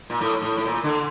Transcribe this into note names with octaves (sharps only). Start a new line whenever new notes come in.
A#2
A2
A2
A2
A#2
D3